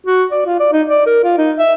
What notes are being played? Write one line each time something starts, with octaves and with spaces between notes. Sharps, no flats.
F#4
D5
F4
D5
D#4
D5
A#4
F4
D#4
E5